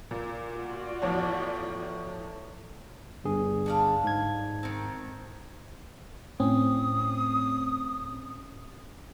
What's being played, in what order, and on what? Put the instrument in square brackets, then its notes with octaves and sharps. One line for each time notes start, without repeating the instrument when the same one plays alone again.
[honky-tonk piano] A#2
[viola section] F4 F#4 D5
[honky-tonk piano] E2 F3 C#5 [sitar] A2
[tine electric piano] G1 G2 G#4
[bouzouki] D3 D4 F5
[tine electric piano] G#2 G#6
[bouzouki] D#3 C4
[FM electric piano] A2 C4 C#4 [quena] D#6